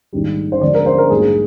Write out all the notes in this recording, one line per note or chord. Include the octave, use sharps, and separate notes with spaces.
A#1 G#2 D#3 G3
C5
D2 D3 F3 G#3 D5
A#4
C5
A#4
A#1 G#2 G3 A#3 G#4